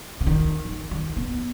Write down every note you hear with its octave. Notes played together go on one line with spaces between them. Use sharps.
C#3
D#3
D#3
D#3
B3